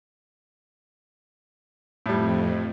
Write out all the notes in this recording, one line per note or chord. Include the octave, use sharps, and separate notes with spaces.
F2 A2 G3